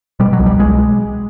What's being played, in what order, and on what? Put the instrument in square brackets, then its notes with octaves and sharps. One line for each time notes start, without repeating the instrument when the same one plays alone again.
[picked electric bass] B2 G3
F#3
C2
G3
G#3